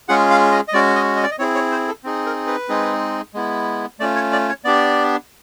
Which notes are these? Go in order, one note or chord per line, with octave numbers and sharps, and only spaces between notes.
G#3 C#4 F4 G#4 F#5
F5
D#5
D#5
G#3 C#4 F#4 D5
D#5
D#5
D5
D#5
C4 E4 G#4 C#5
C#5
C5
A4
C4 D#4 G#4
A#4
B4
G#3 C4 D#4 G#4
G#3 B3 E4
A3 C#4 F4 D5
C#5
D5
C#5
B3 D4 G4 D5